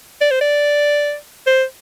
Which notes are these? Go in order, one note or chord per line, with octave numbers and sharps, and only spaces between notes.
D5
C5
D5
C5